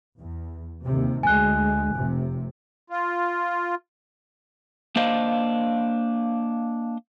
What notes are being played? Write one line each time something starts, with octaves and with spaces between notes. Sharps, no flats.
E2
D#2 C3
D2 G#3 G#5 F#6
F1 C3
F4
A#3 D4 C5 D#5 F5